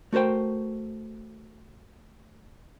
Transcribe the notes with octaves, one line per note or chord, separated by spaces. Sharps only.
A3 F#4 A#4 C5 G5